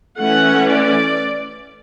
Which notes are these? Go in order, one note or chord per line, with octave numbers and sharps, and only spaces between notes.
E3 A3 C#4 F#5
D5